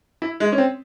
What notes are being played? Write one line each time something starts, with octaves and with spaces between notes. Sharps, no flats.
E4
G#3
C#4
C4